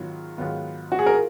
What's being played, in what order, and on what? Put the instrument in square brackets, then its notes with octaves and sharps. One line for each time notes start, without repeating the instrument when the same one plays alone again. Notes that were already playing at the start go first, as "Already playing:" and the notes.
Already playing: [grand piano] G#2 D#3 F#3 B3 F4
G#2 D#3 F#3 B3 F4
[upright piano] F#4
G#4
A#4
[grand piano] F4